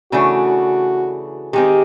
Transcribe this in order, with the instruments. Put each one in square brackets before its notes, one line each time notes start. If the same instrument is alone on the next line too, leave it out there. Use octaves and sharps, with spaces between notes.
[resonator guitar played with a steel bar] C#3 E3 A3 D4 [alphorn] F#4
[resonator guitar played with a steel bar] D#3 G#3 C4 [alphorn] G4